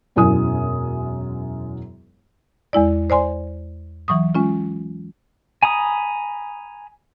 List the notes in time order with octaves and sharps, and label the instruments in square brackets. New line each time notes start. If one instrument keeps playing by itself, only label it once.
[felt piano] E1 F#2 E4 G#5 D#6
[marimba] E2 G#3 E4 D5
C5 D5 G#5 C6
E3 F#3 C#6 D#6
G#3 C#4 F4
[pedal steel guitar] G#5 A#5 B5 D#6